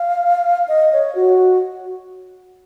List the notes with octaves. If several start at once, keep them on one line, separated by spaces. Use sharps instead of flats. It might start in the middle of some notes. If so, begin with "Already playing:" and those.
Already playing: F5
D#5
C#5
F#4